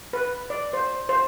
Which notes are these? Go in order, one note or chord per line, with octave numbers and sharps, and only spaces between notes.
B4
D5
C5
C5